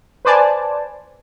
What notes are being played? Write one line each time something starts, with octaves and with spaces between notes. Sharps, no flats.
B4 C5 D5 G#5 A5